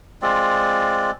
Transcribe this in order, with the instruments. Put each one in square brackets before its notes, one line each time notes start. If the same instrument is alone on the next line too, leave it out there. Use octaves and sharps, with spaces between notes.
[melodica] G#3 C4 F4 D5